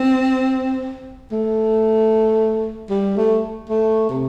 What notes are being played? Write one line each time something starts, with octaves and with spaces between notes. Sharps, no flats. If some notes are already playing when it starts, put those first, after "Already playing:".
Already playing: C4
A3
G3
A3
A3
C3